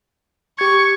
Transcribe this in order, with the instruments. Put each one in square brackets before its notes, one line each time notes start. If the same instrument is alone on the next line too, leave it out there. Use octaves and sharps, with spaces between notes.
[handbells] G4 G#6 [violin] C#6